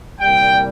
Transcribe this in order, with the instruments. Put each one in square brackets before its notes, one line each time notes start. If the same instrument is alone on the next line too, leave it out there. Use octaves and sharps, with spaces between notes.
[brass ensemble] C2 A#2 G3 G5